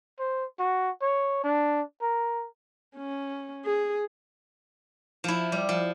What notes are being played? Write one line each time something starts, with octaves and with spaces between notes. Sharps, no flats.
C5
F#4
C#5
D4
A#4
C#4
G#4
F3 E4
G3
F3